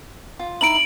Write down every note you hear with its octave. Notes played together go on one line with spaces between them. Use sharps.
F4
D#4 E4 D7 F#7